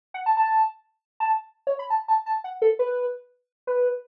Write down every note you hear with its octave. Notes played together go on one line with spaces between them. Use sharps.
F#5
A5
A5
A5
C#5
B5
A5
A5
A5
F#5
A4
B4
B4